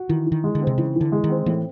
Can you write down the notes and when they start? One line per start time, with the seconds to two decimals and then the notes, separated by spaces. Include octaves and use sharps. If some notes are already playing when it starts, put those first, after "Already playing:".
Already playing: F#4
0.09 D#3 E3
0.26 E3
0.32 D#3
0.44 G#3
0.55 D3
0.61 C4
0.67 C3
0.78 C#3 E3
0.95 E3
1.01 D3
1.12 G#3
1.24 D#3
1.29 C4
1.46 A2 E3